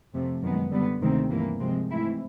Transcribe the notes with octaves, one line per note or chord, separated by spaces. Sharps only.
F2 C3 F3 A3
F#2 D#3 G#3 B3
D3 G3 B3
D2 C3 D#3 G#3 C4
G2 E3 G3 A#3
C3 F3 G#3 C4
G#2 E3 A3 C4 E4